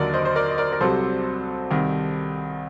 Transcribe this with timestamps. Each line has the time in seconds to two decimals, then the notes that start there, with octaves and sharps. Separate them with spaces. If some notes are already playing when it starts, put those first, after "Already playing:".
Already playing: D#2 D3 F#3 A#4 D5
0.13 C5 D#5
0.25 C5
0.36 A#4 D5
0.50 D#5
0.58 A#4 D5
0.73 A#4
0.81 C2 C3 F#3 A4 C5
1.70 C2 C3 D#3